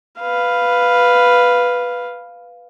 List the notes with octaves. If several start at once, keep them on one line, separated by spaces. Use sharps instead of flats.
B4 F5